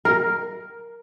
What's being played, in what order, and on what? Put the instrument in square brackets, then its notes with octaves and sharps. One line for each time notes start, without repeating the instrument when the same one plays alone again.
[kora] A#4